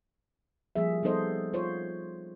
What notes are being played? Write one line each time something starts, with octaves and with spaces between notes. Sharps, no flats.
F3 G3 A#3 G#4 E5
G3 B3 D#4 A4 C5 D#5
F4 C5 C#5